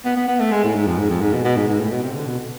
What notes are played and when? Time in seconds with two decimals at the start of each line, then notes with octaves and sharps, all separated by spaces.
0.05 B3
0.16 B3
0.28 B3
0.40 A3
0.51 G#3
0.64 A2
0.75 G#2
0.87 F2
0.98 G#2
1.10 F2
1.21 G#2
1.33 B2
1.44 B2
1.56 G#2
1.68 G#2
1.80 A2
1.91 B2
2.03 C3
2.15 D3
2.26 B2